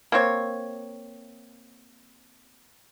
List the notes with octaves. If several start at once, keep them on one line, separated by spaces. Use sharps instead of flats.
A#3 C4 C#5